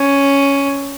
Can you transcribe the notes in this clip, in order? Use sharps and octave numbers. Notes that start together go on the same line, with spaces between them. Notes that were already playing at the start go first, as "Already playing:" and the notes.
Already playing: C#4